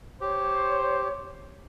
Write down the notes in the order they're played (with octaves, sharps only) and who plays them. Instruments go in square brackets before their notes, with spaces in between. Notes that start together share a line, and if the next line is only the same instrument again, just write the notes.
[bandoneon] G4 [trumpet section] C5 [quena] C#5